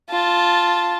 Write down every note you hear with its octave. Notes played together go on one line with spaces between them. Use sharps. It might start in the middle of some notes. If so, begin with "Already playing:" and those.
F4 A5